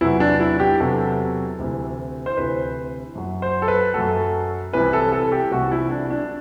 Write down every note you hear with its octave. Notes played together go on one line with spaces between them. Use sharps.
E2 C3 F#3 E4
D4
E4
G4
E2 C3 F#3 A4
D2 C3 E3
C5
D2 C3 E3 B4
F#2 F#3
C5
A4
B4
F#2 F#3 A4
C2 C3 E3 B4
A4
A4
G4
C2 C3 E3 F#4
E4
D4
D4